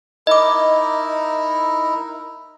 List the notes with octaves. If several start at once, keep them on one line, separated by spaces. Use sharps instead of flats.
D#4 E4 A#4 D#5 D6